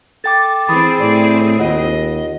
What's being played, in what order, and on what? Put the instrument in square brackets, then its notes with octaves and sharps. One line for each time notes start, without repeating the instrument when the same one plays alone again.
[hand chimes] A4 G5 D6 [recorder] A6
[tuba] E3 [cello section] C4 G#4 [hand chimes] B5 D#6
[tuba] A2 [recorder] D5
[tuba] D#2 [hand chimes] F4 F#5 [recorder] D#5